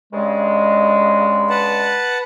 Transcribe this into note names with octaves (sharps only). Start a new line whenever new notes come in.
G2 C#3 G#3
B4 F#5 A5